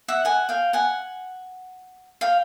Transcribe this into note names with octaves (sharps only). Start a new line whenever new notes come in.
E5 F#5
F#5 G#5
F5 G5
F#5 G#5
F5 G5